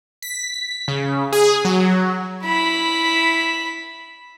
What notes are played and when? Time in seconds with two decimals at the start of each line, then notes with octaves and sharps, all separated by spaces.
0.22 B6
0.88 C#3
1.32 G#4
1.65 F#3
2.44 E4 B5